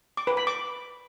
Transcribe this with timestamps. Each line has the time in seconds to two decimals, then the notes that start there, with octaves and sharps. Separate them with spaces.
0.17 D6
0.27 B4
0.37 B5
0.47 D6